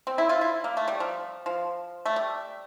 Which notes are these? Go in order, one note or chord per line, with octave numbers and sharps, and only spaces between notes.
C4
E4
F4
E4
A#3
A3
G3
F3
F3
A3
G3